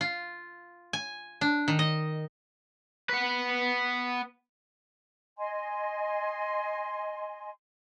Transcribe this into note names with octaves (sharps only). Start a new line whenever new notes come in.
F4
G#5
D4
D#3
D#5
B3 B4
D#5 G#5 C6